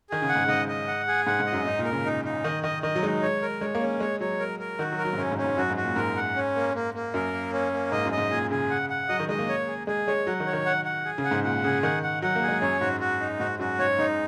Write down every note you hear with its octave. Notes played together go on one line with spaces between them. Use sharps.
D#3 G#4
C#3
F#5
G#2
G#2 D#5
D#5
F#5
G#4
G#2 F#5
G#2
D#5
F#2
G#2 D#4
A#2
A#4
C#3
D#4
D#4
D#3 D#5
D#3 D#5
D#3 D#5
F#3
G#3 D#4
C#5
A#4
G#3 C#5
A#3
C#4
G#3 C#5
F#3 C#5
A#4
A#4
D#3 F#4
F#3
A#4
F#3
G#2
F#2 C#4
G#2
C#4
G#2
F#2 F#4
G#2
F#4
A#2
G#2 A#4
F#5
C#4
A#3
A#3
A#3
F#2 A#4
A#3
C#4
A#3
G#2 D#5
F#2
D#5
G#2
A#2 G#4
C#3 G#4
F#5
F#5
F#3 D#5
D#3
G#3 D#5
A#3
C#5
G#4
G#3 G#4
G#3 C#5
F#3 F#5
D#3
C#5
D#3
F#5
F#5
G#4
C#3
F#5
G#2
A#2 F#5
C#3 G#4
D#3 F#5
F#5
F#3 F#5
A#3
G#4
G#3
F#2 C#5
G#2 F#4
F#4
D#4
G#2 F#4
F#2 F#4
G#2 C#5
G#2 D#4